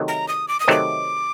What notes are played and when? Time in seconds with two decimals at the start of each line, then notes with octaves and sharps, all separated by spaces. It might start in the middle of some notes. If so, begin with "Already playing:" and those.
Already playing: C3 D#3 F#3 A3 C4
0.08 A#5
0.28 D#6
0.48 D6
0.60 D#6
0.68 C3 D#3 F#3 A3 C4 D6